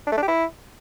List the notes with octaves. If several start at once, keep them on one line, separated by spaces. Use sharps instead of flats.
D4
A3
D4
G4
E4